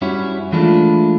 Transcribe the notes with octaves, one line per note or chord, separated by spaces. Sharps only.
F#2 G3 C#4 E4 F#4
E3 G#3 A3 D4 E4 F4